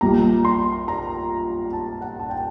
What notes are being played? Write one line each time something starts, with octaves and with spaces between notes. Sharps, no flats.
A#1 A#2 G3 A#5
C6
A#5
A5
F#5
A5
G5